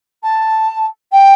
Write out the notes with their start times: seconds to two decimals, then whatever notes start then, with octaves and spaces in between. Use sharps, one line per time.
0.23 A5
1.12 G5